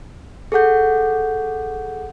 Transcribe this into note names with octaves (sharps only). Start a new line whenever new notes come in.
G#4 A4 F#5 G6